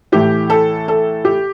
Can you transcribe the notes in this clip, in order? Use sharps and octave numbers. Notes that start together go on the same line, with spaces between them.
A2 E3 A3 E4 G4
A4
A4
G4